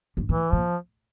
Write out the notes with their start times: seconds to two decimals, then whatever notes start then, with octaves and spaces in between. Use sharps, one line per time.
0.17 G2
0.29 A2 E3
0.52 A#2 F3